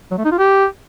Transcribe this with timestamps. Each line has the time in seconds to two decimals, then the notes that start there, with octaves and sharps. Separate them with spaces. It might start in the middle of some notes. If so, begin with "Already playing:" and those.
0.11 F#3
0.18 A3
0.25 D#4
0.32 F4
0.38 G4